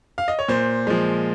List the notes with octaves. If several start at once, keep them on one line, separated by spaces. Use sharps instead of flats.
F5
D#5
C#5
A#2 C5
F3 G#3